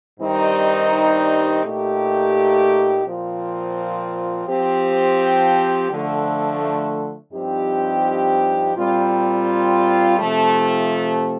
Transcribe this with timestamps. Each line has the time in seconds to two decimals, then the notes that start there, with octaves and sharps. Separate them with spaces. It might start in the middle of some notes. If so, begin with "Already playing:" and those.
0.20 G2 D#3 G3 C4 D#4
1.62 A#2 A3 D#4 G4
3.05 A#2 F3 C4 F4
4.48 F3 C4 G4
5.90 D3 F3 A3
7.32 G2 F3 C4 D#4 G4
8.75 A#2 G3 C4 F4
10.17 C3 F3 A3